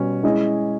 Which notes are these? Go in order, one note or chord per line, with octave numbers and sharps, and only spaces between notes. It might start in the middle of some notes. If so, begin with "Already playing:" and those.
Already playing: B2 G3 C#4
G#3 C#4 E4 G#4 D#5